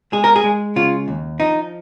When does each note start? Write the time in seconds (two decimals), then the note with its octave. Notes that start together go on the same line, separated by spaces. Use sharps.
0.12 G#3 G#4
0.24 A#4
0.36 G#4
0.44 G#3
0.76 C#3 F4
1.08 D#2
1.40 F3 D#4